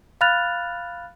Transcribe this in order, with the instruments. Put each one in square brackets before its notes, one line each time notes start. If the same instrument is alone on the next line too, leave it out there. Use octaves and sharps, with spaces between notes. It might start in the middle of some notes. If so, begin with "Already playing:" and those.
[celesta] F5 B5 F6 F#6 A6 F7